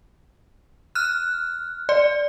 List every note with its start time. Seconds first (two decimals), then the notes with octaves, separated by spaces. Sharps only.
0.95 F6 F#6
1.89 D5